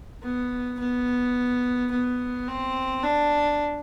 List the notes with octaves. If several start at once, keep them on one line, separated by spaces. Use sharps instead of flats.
B3
B3
B3
C4
D4